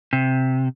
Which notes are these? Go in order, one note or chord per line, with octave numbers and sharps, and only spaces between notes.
C3